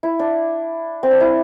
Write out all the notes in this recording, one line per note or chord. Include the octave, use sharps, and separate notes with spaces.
E4
D4
C4
D4
E4